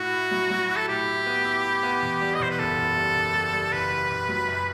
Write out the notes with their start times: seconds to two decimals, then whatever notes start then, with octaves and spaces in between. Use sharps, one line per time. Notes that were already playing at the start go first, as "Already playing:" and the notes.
Already playing: A2 E4 F#4
0.12 E4
0.31 F#3
0.51 F#3
0.69 E4
0.77 A4
0.88 A2 G4
1.08 E4
1.26 B3
1.45 E4
1.64 E4
1.83 B3
2.02 E2
2.21 G3
2.35 D#5
2.40 E2 C5
2.50 B4
2.59 F#1 A4
2.77 F#1
2.96 G3
3.15 F#1
3.35 G3
3.53 G3
3.73 F#1 B4
3.91 G3
4.10 F#1
4.29 F#3
4.48 F#2